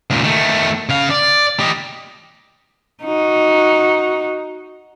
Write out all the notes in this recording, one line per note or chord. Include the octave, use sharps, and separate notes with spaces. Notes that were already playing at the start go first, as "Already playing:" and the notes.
C#2 A#2
D#3 A3
C#3 F5
D5
G4 D#5
D#4 F#4